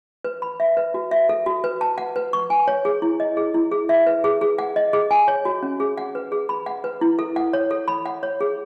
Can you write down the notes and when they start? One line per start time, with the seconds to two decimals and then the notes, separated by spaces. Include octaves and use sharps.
0.24 B4
0.42 B5
0.60 E5
0.77 B4
0.94 F#4
1.11 E5
1.29 A4
1.46 F#4
1.64 B4
1.81 A5
1.98 F#5
2.16 B4
2.33 C#6
2.50 G#5
2.68 C#5
2.85 G#4
3.02 E4
3.20 D#5
3.37 G#4
3.54 E4
3.72 G#4
3.89 E5
4.07 B4
4.24 G#4
4.41 G#4
4.58 F#5
4.76 D#5
4.93 G#4
5.11 G#5
5.28 C#5
5.45 F#4
5.62 C#4
5.80 G#4
5.98 F#5
6.15 B4
6.32 G#4
6.49 B5
6.66 F#5
6.84 B4
7.01 E4
7.19 A4
7.36 F#5
7.53 C#5
7.71 A4
7.88 B5
8.06 F#5
8.23 C#5
8.41 G#4